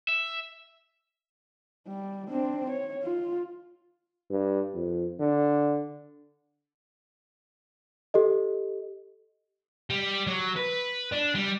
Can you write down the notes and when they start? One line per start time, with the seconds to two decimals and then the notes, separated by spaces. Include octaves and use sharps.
0.09 E5
1.88 G3
2.29 C4 D4
2.70 C#5
3.03 F4
4.30 G2
4.74 F2
5.20 D3
8.14 G4 A4 D#5
9.90 G3
10.27 F#3
10.57 B4
11.12 D4
11.35 G3